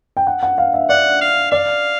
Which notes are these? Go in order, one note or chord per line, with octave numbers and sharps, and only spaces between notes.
G5
F#5
F#5
F5
E5
D5 F#5
F5
D5 F5